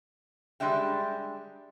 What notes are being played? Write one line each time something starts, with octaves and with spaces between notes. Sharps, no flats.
G3 G#3 D4 E5 G5